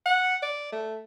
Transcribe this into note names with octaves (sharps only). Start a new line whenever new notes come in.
F#5
D5
A3